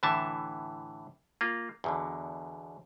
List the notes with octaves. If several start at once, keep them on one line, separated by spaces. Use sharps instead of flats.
A2 D3 E3 E5 A5
A#3 F4
E2 B2 D3